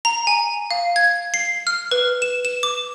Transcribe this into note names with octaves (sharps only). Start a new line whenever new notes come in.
A#5
G#5
F5
G#6
C7
F6
B4
E7
E7
D6